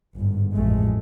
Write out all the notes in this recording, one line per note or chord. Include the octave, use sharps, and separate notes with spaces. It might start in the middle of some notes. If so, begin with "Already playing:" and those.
G1 G#2
A1 F2 G#3 A3